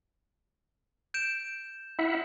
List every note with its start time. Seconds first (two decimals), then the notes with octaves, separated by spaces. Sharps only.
1.14 G6 D7 E7
1.99 E4 E5 F#5